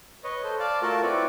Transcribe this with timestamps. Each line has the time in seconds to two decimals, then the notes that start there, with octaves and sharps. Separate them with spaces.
0.24 B4 C#5 D#5
0.44 A4 C5
0.60 D5 F5 A5
0.82 A3 F4 F#4 A4 A#4 A5
1.03 C4 E4 B4 C#5 D5